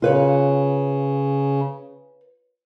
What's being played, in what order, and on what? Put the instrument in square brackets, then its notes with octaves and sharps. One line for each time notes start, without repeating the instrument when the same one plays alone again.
[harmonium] C#3 [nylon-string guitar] F4 B4 C#5